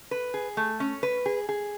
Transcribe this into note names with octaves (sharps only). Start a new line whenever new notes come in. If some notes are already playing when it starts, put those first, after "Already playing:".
B4
G#4
A3
C#4
B4
G#4
G#4